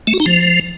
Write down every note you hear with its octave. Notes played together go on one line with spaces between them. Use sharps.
A3
F#4
D#4
F3